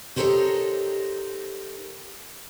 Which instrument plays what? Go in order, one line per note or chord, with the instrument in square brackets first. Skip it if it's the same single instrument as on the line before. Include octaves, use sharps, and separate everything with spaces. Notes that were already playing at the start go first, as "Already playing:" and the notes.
[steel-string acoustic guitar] D#4 G4 A4 A#4 C5 C#5